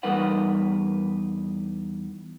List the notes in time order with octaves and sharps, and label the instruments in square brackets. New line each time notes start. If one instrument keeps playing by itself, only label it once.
[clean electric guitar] E2 G3 D#4 A#4 B4 F#5